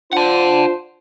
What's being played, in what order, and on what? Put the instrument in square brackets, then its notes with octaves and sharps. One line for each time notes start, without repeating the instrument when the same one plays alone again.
[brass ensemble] D4 F4 C5 [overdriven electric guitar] F#5 A5